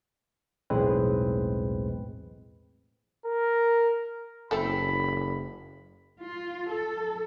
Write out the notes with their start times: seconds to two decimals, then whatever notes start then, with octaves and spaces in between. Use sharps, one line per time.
0.70 B1 E2 A2 G#3 C4 B4
3.26 A#4
4.51 F#1 C4 E4 A4 B5
6.20 F4
6.70 A4